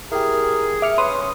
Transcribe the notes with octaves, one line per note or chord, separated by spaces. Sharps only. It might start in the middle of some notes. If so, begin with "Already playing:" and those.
E4 G4 G#4 A#4
E5 D6 F6 C#7
C#4 B4 C6 D#6